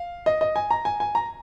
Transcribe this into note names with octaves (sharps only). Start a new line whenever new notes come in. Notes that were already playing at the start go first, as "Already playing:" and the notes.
Already playing: F5
D#5
D#5
G#5
A#5
G#5
G#5
A#5